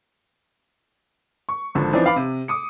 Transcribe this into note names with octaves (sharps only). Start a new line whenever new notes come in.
C#6
G#1 D3 F3
E3 F3 C4 D4 D#4
B4 F5 B5 D6
C3
D6 D#6 C#7